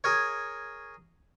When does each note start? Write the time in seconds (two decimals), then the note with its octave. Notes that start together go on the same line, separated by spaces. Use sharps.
0.04 G#4 A#4 C#5